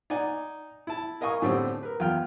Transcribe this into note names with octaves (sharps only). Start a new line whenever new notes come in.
D#4 D5 F#5 G#5
E4 A5
A#4 D#5 F5 G#5 C#6 D#6
A2 D3 A3 C4 G4
A#4 B4
E2 F4 G5 F6